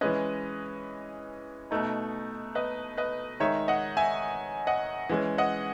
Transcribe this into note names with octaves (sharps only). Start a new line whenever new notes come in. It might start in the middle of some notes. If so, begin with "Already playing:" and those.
E3 G#3 C#4 B4 D#5
B2 A3 D#4
B4 D#5
B4 D#5
D#3 G#3 D#4 C#5 E5
D#5 F#5
E5 G#5
D#5 F#5
E3 G#3 C#4
D#5 F#5